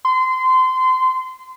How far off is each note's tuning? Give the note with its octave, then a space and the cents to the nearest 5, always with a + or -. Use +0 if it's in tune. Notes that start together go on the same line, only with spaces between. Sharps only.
C6 -25